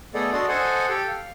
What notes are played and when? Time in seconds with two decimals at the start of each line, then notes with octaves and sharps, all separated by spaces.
0.14 A3 B3 G#4 A4 D5 D#5
0.33 D4 F#4 D5 D#5 C6
0.49 A4 C5 D#5 F#5 G#5
0.89 G4 A4 G5
1.08 F5